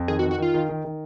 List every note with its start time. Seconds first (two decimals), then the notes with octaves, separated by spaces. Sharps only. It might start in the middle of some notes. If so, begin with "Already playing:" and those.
Already playing: F2
0.08 D#3 G#4
0.19 F#4
0.23 D#3
0.31 F#4
0.38 D#3 F4
0.54 D#3
0.69 D#3
0.85 D#3